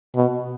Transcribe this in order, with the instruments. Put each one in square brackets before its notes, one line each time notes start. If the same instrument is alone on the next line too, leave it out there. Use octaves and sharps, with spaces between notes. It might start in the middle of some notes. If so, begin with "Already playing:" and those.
[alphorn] B2